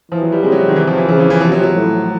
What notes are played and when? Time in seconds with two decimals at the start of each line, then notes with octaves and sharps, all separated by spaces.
0.11 E3 F3
0.22 F#3
0.32 G3
0.43 C3 G#3
0.52 F#3
0.68 D#3
0.76 E3
0.87 F3
0.98 E3
1.09 C#3 F3
1.19 E3
1.30 E3
1.41 C3 F3
1.52 F#3
1.63 F#3
1.74 A2